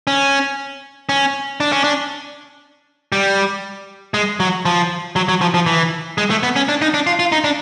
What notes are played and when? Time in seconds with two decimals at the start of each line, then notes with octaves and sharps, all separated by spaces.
0.07 C#4
1.09 C#4
1.60 D4
1.72 C#4
1.84 D4
3.12 G3
4.14 G#3
4.40 F#3
4.65 F3
5.16 F#3
5.29 F#3
5.41 F3
5.54 F3
5.66 E3
6.18 G#3
6.30 A3
6.43 B3
6.56 C#4
6.69 D4
6.82 D#4
6.94 D4
7.07 F4
7.19 F4
7.32 D#4
7.44 D4